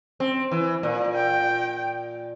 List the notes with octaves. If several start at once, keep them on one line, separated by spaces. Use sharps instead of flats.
C4
E3
A#2
G5